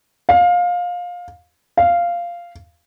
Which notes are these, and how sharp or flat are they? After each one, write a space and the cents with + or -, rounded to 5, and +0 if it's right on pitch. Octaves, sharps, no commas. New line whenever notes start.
F5 +20
F5 -10